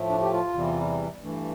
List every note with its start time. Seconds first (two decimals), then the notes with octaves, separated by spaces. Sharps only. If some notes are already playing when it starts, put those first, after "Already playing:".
Already playing: A2 F3 A3
0.09 D4
0.21 G4
0.32 F4
0.54 E2 C3 E3 G3
1.21 G2 E3 A3